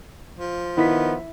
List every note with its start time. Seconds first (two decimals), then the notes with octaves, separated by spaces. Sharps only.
0.39 F3
0.77 D#3 B3 E4 B6